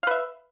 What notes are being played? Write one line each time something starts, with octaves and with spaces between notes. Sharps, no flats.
B4 E5 F5